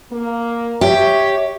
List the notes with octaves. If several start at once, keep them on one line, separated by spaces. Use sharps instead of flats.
A#3
G4 C#5 E5